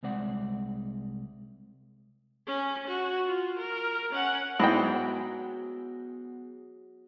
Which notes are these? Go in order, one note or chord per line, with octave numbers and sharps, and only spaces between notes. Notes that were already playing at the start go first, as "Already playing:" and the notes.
C2 C3 G#3 C4 D5 F#5
C#4
F#4
F4
A#4
C#4 F#5
G#2 F#3 B3 E4 G#4 G5 A#6